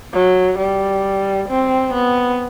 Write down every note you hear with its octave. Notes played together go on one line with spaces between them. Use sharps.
F#3
G3
C4
B3